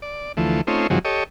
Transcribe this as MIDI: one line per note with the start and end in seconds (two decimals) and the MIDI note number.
0.02 0.32 74
0.37 0.61 38
0.37 0.61 52
0.37 0.61 53
0.37 0.61 57
0.67 0.87 57
0.67 0.87 60
0.67 0.87 61
0.67 0.87 63
0.67 0.87 65
0.90 0.99 42
0.90 0.99 48
0.90 0.99 51
0.90 0.99 53
0.90 0.99 54
0.90 0.99 56
1.05 1.24 67
1.05 1.24 69
1.05 1.24 73
1.05 1.24 75